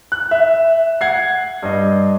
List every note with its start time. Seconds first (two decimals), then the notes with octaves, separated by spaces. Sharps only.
0.12 F#6
0.31 E5
1.01 F#5 G#6 C7
1.62 G2 D#5